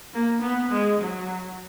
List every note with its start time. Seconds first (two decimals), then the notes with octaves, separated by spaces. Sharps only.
0.14 A#3
0.42 B3
0.71 G#3
1.01 F#3